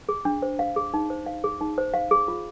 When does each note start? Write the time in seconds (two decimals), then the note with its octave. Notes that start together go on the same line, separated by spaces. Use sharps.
0.09 G#4
0.25 D4
0.42 C5
0.59 F5
0.76 G#4
0.94 D#4
1.10 C5
1.26 F5
1.44 G#4
1.61 D#4
1.78 C5
1.94 F5
2.11 G#4
2.28 F4